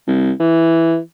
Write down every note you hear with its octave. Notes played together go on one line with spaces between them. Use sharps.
C2
E3